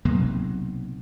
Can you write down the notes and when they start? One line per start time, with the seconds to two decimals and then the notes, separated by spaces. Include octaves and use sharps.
0.05 B1 C3 F#3 A#3